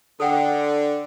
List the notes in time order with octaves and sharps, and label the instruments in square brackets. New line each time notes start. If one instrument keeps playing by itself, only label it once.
[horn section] D3 [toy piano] A4 F#5 G5